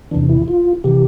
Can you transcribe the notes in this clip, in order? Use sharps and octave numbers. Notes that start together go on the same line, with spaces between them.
E2 C3 E3 D4
E4
F4
C3 E3 G4